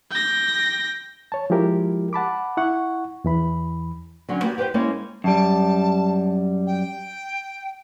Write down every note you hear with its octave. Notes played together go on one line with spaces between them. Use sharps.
G5 A#6
C#5 A5
F3 G#3 E4 G4 A#4
F#5 A5 B5 D6
E4 F#5 C#6
E2 E3 B5
D3 F#3 C#4
A#3 B3 F#4 G4
G4 B4 C5 G5
G#3 A#3 C#4 E4 A4 C#5
F#2 G3 A5
G5